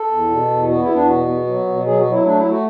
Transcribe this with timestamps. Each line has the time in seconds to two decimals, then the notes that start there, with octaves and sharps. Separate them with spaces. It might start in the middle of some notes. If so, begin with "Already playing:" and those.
Already playing: A4
0.11 E2
0.30 B2
0.50 E2
0.69 B3 F#4
0.82 E4
0.89 E2
0.95 D4
1.08 B2 F#4
1.28 B3
1.47 F#3
1.67 B2
1.86 F#3 G#4
1.99 F#4
2.05 F#3
2.12 E4
2.25 A3 D4
2.38 E4
2.45 A3
2.51 F#4